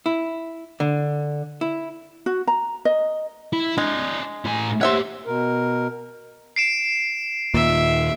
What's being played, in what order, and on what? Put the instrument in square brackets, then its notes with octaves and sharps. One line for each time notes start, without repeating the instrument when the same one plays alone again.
[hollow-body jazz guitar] E4
D3
E4
[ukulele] F#4
A#5
D#5
[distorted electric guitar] E4
[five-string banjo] G#3 [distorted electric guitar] D4 D#5
[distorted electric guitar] A2 G#5
[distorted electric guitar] G4 C#5 [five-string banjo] C5 E5 F#5
[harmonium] B2 A#4
[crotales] C7 D7 E7
[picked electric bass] D#2 A#2 [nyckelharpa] E5